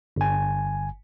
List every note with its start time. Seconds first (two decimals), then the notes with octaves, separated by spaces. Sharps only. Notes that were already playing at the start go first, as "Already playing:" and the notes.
0.16 G1 G#5